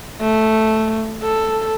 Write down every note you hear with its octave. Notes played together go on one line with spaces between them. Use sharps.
A3
A4